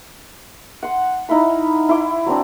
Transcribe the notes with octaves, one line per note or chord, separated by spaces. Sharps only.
F#5 C6
D#4 E4 F5 B5
E4 C6 D6
F#3 C4 D4